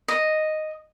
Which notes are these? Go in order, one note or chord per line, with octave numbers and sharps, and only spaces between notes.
D#5